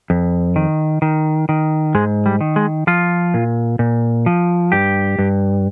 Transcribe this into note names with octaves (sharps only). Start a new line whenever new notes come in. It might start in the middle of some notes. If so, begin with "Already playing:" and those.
F2
D#3
D#3
D#3
G#2 G#3
G3
D#3
G#3
F3 F4
A#2
A#2
F3
G2 G4
G2